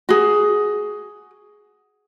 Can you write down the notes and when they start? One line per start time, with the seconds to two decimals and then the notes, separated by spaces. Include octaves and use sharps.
0.09 F#4 G#4